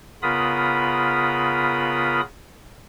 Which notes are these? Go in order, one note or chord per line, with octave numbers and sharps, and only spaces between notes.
C#3 B3 F4 A#4 B5 D#6